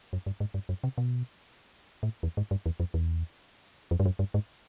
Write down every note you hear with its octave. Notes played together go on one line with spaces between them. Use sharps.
F#2
G2
G#2
G2
F#2
C3
B2
A2
E2
G#2
G2
E2
F2
E2
F2
G2
F#2
G2
G#2